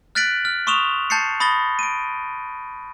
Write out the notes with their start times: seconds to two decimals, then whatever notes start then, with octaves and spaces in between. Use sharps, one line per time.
0.15 F6 F#6 A6 B6 D7 F#7
0.45 F6
0.67 C6 C#6 D#6 E7 F7 G7
1.10 A5 G6 A6 C7 C#7
1.40 B5 D#6 A6 A#6 G7
1.79 D7 D#7